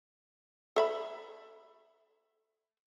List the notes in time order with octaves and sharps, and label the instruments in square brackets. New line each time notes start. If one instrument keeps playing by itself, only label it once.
[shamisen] A4 E5 B5